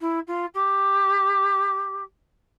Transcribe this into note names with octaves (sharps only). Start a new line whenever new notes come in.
E4
F4
G4